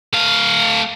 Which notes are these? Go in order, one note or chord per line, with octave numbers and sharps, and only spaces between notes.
A3 F5